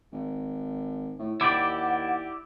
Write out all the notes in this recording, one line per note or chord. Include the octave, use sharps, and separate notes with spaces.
G#1
A2
D#2 E4 G4 D5 F#5 D6